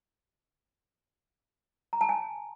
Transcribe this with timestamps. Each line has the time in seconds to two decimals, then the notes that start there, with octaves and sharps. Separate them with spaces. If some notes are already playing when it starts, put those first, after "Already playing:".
1.93 A#5
2.01 A5
2.09 G#5